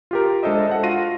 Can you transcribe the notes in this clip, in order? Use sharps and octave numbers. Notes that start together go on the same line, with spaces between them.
F4 G4 A#4
G#3 D4 A4 C5 D#5 E5
A4 C5 F#5
F4 F#4 F5 A#6 D#7